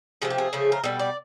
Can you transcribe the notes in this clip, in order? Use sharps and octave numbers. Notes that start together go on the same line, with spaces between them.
C3 F3 A3 G#4
G4
G#4
C#3 F3 A3
A#4
B2 G3 A4
D5